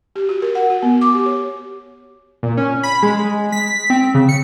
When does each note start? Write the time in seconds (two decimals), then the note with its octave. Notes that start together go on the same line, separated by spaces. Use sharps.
0.16 G4
0.29 F#4
0.42 A#4
0.55 F#5
0.70 F#4
0.82 B3
1.01 D6
1.14 G4
1.26 C#5
2.43 A#2
2.57 C#4
2.83 B5
3.03 G#3
3.52 B6
3.90 C4
4.14 C#3
4.29 C#7